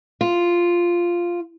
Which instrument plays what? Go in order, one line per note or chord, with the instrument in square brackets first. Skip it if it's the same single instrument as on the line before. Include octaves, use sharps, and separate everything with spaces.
[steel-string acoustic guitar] F4